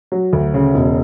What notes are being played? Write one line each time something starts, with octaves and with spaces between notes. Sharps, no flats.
F#3
D2
C#3
E1